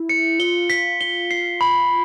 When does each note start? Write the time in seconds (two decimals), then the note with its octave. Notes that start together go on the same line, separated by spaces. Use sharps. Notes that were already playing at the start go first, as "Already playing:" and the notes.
Already playing: E4
0.09 C#7
0.39 F4 G7
0.70 B6
1.01 G7
1.31 C7
1.61 B5